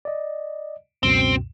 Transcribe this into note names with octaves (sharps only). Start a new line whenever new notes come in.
D5 D#5
C#2 F#2 B2 C4